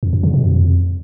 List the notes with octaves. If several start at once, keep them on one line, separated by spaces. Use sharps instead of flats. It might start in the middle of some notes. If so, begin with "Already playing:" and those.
F2
F#2
C#3
B2
F2